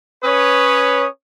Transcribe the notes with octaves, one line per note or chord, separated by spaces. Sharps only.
C#4 B4 C#5 D#6